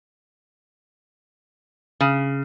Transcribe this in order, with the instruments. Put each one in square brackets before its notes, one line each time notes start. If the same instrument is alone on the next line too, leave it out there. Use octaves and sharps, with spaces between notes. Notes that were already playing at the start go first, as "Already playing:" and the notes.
[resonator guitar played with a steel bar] C#3